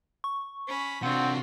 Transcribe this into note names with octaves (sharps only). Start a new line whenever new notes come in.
C#6
C#4 B5
C3 C4 D4 F4 F#4 F#5